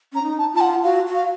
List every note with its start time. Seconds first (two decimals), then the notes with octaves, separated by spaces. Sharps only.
0.13 C#4 A#5
0.23 D#4
0.39 A5
0.53 F4 A5
0.61 F#5
0.83 F#4 F5
1.07 F#4
1.14 F5